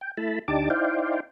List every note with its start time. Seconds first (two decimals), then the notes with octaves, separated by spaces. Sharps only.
0.01 G5
0.17 A3 E4 A5 B5
0.48 D2 D4 D#4 G4 A5 D6
0.70 D#4 E4 C5 D5 F5 G5